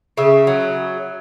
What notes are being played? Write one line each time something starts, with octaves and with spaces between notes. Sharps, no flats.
C#3 E5
F#3